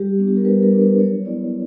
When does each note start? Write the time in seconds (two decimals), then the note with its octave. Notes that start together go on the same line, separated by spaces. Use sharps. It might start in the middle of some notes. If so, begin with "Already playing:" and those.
Already playing: G3 G4
0.19 B3 D4
0.28 G4
0.37 A#4
0.45 G3 B4
0.63 A#4
0.72 B3 D4
0.81 B4
0.99 F#3 C#5
1.25 B3 E4 D5